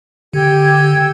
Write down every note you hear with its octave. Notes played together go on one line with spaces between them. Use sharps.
D3 G4 G5 E6 G#6